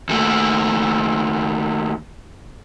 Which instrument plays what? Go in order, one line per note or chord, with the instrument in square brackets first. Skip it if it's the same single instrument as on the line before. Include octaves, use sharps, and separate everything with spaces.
[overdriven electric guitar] D#2 A3